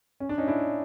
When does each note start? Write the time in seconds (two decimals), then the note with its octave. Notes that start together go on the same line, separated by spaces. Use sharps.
0.20 C#4
0.29 D4
0.38 C#4 D#4
0.48 D4 E4